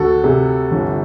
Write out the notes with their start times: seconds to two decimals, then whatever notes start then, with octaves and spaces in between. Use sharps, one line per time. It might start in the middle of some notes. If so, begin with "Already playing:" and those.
Already playing: D2 F#4 A4
0.24 C3
0.71 G1